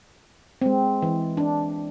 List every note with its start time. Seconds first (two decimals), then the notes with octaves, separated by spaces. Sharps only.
0.62 G#3 C4
1.02 E3
1.37 D4